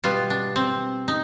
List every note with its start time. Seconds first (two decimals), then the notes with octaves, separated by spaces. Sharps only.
0.04 B2 G3 B3 F4
0.30 D4
0.56 C4
1.08 D#4